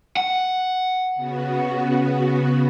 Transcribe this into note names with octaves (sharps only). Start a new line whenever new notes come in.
F#5
C#3 B3 F#4